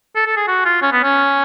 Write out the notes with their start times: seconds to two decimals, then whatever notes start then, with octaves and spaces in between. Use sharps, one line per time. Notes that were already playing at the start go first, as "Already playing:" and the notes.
0.16 A4
0.26 A4
0.37 G#4
0.48 F#4
0.65 F4
0.82 C#4
0.92 B3
1.04 C#4